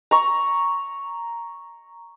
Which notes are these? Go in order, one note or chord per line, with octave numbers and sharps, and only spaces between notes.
A#5 C#6